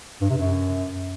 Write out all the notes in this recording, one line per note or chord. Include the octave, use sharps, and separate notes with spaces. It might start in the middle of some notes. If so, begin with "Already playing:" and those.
G2
C3
F#2